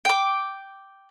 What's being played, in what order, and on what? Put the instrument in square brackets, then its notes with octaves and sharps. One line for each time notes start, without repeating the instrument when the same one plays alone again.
[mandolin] G5 D6